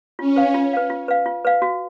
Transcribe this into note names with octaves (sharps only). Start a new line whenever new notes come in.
C#4 F4
B4 F5
F4
B4 F5
F4
B4 F5
F4
B4 F5
F#4